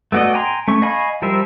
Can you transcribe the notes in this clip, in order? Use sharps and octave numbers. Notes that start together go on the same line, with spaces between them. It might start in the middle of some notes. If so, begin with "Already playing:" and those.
A3 B3 F#4 D5 D#5
G5 G#5 A#5 C6
A3 C#4 C#6
D#5 F5 G#5 B5 C#6
F3 G3 A#4 C5 E5